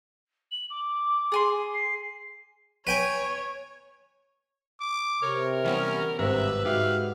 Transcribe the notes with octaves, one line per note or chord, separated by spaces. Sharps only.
F#7
D6
G#4 G#5 C6
C7
B4 C#5 G5 G#5
D6
C3 A#4 C#5
E3 G3 B3 C#4
G#1 G2 C3 B4 E5 A#5
G#2 F#4 G4 E5 F5